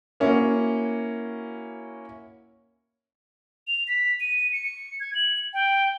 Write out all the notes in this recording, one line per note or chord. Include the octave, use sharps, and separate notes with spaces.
A#3 C#4 E4 F#4
F7
B6
D#7
C#7
G#6
F#7
G5